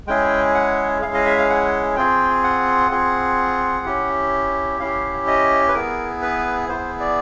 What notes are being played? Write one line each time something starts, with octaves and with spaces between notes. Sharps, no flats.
G#3 C#4 E4 G#4 G5
F#5
G#3 C#4 E4 G#4 F5
D#5
E5
F5
F#5
C4 F4 G#4 G5
F#5
C4 F4 G#4
C#4 E4 G4
C#4 E4 G4 F5
D#5
B4
B3 E4 G#4 A#4
B4
B3 E4 G#4 C5
D5